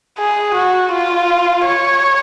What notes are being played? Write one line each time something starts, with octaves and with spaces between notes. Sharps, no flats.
G#4
F#4
F4
C#5